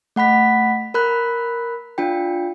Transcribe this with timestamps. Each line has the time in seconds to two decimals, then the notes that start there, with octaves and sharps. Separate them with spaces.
0.16 A3 F#5 B5 B6
0.94 A#4 B5 F#6
1.98 D4 F4 G5